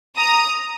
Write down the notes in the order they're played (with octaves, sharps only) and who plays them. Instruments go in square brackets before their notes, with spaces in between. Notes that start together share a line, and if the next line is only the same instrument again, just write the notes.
[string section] A#5 D#6